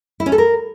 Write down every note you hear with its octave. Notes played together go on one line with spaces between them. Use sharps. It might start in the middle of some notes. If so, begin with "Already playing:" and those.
E4
C#4
A4
A#4